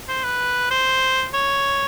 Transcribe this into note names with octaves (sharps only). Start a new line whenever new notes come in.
C5
B4
C5
C#5